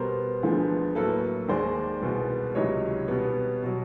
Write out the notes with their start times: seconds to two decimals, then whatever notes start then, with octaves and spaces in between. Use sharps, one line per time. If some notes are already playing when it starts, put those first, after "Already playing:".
Already playing: B2 G3 B3 A#4 C5
0.43 D2 D3 F3 G#3 B3
0.95 A2 F#3 A#3 A4 B4
1.48 D#2 D#3 G#3 C5 D5
2.02 C2 B2 G#3 B3
2.55 C#2 C3 D#3 F#3 C#5 D#5
3.08 B2 G3 B3
3.64 B2 F#3